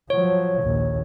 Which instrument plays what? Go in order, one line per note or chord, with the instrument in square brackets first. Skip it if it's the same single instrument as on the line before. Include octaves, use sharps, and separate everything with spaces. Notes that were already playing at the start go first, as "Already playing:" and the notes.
[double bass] F3 F#3 [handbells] C#5
[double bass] A#1 D#2